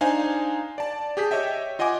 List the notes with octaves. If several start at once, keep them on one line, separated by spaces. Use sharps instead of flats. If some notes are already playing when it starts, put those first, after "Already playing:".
D4 D#4 C5 F5 G#5
D5 A5
G4 G#4 G6 B6
G4 C#5 D#5 E5 G5
F4 D#5 F#5 G#5 D6